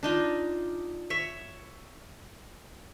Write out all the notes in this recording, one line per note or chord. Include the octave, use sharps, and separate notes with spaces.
D4 D#4 F4
C#5 E5